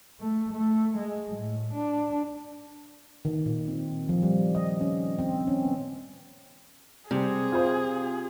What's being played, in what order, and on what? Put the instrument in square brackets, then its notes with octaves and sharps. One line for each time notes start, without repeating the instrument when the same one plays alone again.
[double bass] A3
A3
G#3
A2
D4
[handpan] D#3
A#2
C4
F3
G3
D#5
C#4
C4
C#4
B3
[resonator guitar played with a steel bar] C3 [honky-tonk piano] G3 [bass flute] C4 [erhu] G#4
[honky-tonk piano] F4 C5